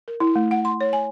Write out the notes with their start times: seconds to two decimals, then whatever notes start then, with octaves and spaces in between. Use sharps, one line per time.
0.08 A#4
0.20 E4
0.36 A3
0.51 F#5
0.65 C6
0.81 C#5
0.93 G#5